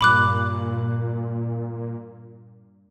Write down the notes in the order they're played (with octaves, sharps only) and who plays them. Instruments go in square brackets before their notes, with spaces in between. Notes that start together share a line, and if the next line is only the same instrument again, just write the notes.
[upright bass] G2 [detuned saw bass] A#2 [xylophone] B5 D6 F#6